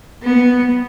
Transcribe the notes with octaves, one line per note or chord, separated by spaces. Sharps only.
B3